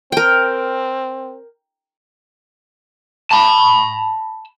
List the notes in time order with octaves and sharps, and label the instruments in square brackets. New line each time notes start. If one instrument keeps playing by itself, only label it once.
[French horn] C4 [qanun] A#4 G5
[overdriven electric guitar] A5 B5